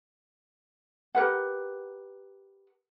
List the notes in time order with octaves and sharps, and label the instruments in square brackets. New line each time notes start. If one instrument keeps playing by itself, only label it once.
[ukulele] G4 A#4 B4 F#5